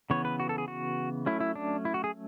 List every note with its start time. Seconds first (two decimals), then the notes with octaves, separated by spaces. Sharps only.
0.10 C#3 E3 B3 C#5
0.25 B4
0.40 F#4
0.49 A4
0.58 G#4
0.68 F#4
1.26 F#3 A3 C#4 E4
1.40 E4
1.55 D4
1.85 E4
1.94 F#4
2.04 G#4